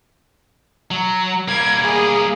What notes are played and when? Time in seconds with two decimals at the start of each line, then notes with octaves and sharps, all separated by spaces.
0.91 F#3
1.48 G3 A#3 G#6
1.83 G#4